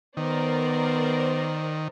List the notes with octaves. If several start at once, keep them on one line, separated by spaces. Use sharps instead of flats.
D#3 B3 A#4 C5 D5